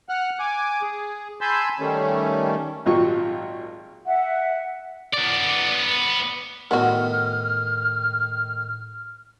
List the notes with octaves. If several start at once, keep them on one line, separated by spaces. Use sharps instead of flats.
F#5 F6 F#6
G#5 D6
G#4
G#5 A5 B5 C6 E6 G6
D#3 G3 A3 C#4
G#1 A#2 F#3 F4 G4 C#6
E5 F#5
B3 D5
A2 D#3 B3 F#4 F6